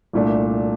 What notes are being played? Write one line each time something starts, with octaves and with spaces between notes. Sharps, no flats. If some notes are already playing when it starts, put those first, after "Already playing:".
C2 A#2 A3 D4